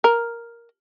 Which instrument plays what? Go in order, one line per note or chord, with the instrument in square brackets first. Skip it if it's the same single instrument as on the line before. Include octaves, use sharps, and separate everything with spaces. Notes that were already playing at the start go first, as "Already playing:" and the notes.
[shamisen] A#4